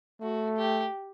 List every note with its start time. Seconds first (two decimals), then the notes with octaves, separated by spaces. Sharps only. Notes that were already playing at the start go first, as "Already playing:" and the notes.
0.21 A3 F#4
0.57 G4